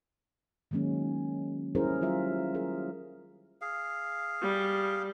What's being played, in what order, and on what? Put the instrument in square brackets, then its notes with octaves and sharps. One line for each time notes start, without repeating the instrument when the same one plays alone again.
[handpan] D#3 F#3 G#3 A#3 C#4
G3 C#4 E4 G#4 A#4 C5
F#3 G3 F4 E5
G#4 A#4
[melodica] G#4 F5
[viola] G3